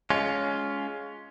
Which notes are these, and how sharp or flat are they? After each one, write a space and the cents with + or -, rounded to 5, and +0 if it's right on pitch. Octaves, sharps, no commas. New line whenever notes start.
G#3 +15 C#4 +20 F4 +0